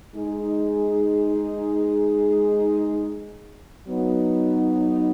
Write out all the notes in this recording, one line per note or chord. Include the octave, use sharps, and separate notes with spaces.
G#3 D#4 G#4
F#3 B3 D#4